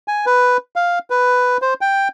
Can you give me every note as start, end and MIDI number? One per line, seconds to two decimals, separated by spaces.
0.08 0.25 80
0.26 0.57 71
0.76 0.99 77
1.10 1.57 71
1.62 1.74 72
1.81 2.08 79